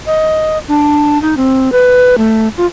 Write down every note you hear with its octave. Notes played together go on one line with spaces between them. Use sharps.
D#5
D4
D#4
C4
B4
A3
F4